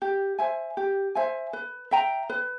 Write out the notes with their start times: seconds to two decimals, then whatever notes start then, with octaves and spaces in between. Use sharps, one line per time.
0.02 G4
0.39 C5 E5 G#5
0.77 G4
1.15 C5 E5 G#5
1.53 B4
1.91 E5 G5 A#5
2.30 B4